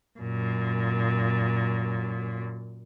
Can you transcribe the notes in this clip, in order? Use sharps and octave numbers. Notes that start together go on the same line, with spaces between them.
F#2 A#2